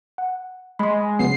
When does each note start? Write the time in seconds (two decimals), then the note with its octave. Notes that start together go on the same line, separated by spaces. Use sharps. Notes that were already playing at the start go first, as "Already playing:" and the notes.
0.18 F#5
0.79 G#3 B5 C6
1.19 C#3 F#3 B3 C7